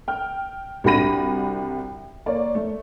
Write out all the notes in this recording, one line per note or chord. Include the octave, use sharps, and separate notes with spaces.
G5 F6
C2 D4 F#4 B5 A#6 D#7
A#3 C#5 D5
A3